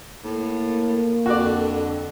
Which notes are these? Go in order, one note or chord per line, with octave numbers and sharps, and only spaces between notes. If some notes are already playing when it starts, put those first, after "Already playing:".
A2 A#3
F2 D3 F#4 D5